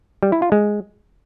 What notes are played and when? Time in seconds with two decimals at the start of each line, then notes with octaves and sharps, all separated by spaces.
0.23 G3
0.32 E4
0.42 F4
0.52 G#3